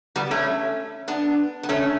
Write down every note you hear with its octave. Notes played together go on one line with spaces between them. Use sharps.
G3 B3
A3 C#4
B3 D4
B3
A3 C#4